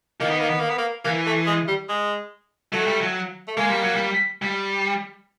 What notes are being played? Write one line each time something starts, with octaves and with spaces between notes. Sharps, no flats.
D#3 A#3
B3
A#3
B3
A#3
B3
A#3
E3 A#3
A3
G#3
G3
G#3
F#3 A3
G3
F#3
A3
G#3 A#3
G3
F#3
G3
G3